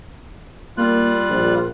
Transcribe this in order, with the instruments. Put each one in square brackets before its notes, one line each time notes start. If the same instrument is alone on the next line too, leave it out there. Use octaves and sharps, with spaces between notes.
[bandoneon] G3 F4 F#6 [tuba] A#3
[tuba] A#1